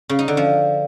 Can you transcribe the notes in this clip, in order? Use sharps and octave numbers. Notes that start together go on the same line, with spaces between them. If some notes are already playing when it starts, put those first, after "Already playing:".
C#3
D#4
D3
F3